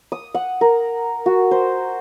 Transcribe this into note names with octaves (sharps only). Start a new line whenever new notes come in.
D#6
F#5
A#4
F#4
C5